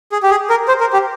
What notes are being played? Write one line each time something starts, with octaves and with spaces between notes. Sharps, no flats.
G#4
G4
G#4
A#4
C5
A#4
G4